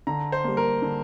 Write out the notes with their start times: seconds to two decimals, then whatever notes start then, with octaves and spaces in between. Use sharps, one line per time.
0.07 D3 A#5
0.32 C5
0.44 G3 A#3
0.57 A#4
0.82 D3